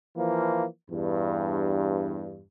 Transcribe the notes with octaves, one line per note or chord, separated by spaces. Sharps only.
E3 F3 A#3
E2 G2